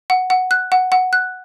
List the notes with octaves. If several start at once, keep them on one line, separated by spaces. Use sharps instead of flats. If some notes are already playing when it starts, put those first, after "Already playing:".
F#5
F#5
F#6
F#5
F#5
F#6